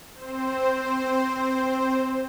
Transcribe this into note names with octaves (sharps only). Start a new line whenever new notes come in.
C4 C5